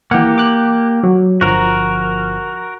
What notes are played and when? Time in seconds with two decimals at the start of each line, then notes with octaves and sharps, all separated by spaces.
0.11 E3 A#3 G4 F#5
0.38 D6 F#6
1.03 F#3
1.41 G1 F3 F#4 A#4